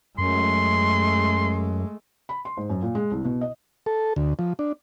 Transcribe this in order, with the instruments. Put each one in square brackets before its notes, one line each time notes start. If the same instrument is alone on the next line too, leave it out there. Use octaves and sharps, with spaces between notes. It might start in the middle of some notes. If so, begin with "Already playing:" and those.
[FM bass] F#2 [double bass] G#3 A3 [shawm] C6
[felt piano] B5
C6
G#2
F#2
A#2
G#3
C2
B2
D#5
[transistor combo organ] A4
D2
F3
D4